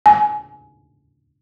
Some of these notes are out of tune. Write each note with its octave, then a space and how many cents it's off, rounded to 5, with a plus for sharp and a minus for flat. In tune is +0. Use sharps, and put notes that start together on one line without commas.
G#5 +20